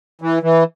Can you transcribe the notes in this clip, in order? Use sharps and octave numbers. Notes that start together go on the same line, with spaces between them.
E3
E3